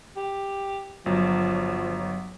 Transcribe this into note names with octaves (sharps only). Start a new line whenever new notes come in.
G4
G1 F3 F#3